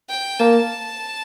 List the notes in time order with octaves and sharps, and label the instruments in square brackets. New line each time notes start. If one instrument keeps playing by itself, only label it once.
[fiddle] G5
[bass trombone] A#3 [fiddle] A5